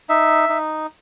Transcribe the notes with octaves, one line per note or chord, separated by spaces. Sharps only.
D#4 E5
D#4